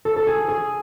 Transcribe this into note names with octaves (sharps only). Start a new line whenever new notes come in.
A4
A4
G#4
G#4